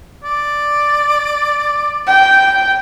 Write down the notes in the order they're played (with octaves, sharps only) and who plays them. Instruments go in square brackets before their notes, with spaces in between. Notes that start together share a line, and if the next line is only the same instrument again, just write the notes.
[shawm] D5
[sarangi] G5